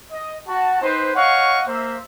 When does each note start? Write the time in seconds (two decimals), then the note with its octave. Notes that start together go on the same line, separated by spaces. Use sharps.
0.12 D#5
0.48 F#4 A5
0.82 C4 D#4 B4 C5
1.15 C#5 D#5 F5 F#5 C#6
1.67 A#3 C5 E5